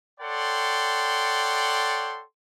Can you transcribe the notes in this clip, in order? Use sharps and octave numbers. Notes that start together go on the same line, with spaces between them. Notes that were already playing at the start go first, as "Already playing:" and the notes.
A4 C#5 D5 F#5 G5 C6